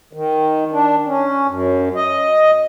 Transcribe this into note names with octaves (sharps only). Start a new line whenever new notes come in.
D#3
D4
C#4
F#2
D#5